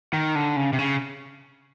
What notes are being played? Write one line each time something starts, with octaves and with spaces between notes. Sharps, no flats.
D#3
D3
C#3
C3
C#3